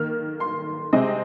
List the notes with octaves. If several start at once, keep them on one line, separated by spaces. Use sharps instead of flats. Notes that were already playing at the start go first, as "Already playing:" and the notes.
Already playing: D#3 A#3 F6
C6
C3 G#3 C4 D#5